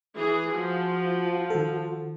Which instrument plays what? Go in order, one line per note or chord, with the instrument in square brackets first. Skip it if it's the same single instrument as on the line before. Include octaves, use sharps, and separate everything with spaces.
[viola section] E3 G#4
[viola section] F3 [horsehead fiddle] F4 F#4
[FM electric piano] D#3 A4